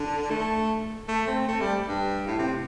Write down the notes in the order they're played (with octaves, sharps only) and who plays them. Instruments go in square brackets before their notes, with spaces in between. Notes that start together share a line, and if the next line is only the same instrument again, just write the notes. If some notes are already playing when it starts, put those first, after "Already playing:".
Already playing: [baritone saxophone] D3
A3
A3
C4
A3
G3
G2
A2
C3